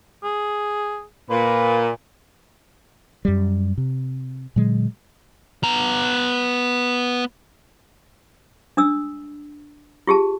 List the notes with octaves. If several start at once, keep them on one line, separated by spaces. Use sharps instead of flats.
G#4
A#2 B4
F#2 G3
C3
A#2 D3 F#3 G#3
B3 A#5
D4 D#6 E6
F4 G4 G#4 A5